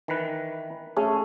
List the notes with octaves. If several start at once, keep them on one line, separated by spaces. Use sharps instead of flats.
D#3 E3 B4
A3 C#4 G#4